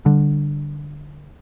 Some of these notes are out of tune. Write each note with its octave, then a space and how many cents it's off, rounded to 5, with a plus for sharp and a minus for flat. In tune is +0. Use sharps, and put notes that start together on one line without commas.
D3 +0 G3 +0